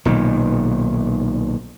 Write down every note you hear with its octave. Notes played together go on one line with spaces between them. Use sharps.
B1 A#2 D#3